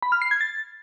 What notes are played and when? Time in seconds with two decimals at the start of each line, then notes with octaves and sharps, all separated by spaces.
0.02 B5
0.12 F6
0.22 C7
0.31 G#6
0.41 A6